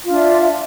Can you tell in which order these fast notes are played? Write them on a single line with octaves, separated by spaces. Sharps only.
F4 D4 E5